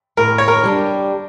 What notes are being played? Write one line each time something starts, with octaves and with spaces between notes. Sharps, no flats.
A2 A#4
C#5
A#4
G3 D4 G4